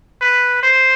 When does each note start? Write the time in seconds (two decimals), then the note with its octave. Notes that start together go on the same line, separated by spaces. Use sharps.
0.21 B4
0.63 C5